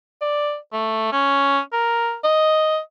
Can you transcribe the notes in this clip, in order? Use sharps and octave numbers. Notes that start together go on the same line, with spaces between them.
D5
A3
C#4
A#4
D#5